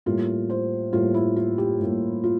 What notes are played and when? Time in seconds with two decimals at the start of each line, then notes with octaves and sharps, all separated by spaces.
0.06 A2 G3 A#3 F4
0.50 C5
0.93 A2 G3 A#3 F4
1.14 E4
1.36 F4
1.58 G4
1.80 A2 G3 A#3
2.24 F4